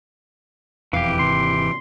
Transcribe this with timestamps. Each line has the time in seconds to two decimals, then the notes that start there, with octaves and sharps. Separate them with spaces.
0.93 E1 F2 E3 G4 F5
1.19 G#1 C3 C6